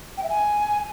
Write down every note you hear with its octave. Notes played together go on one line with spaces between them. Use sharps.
G5
E5
G#5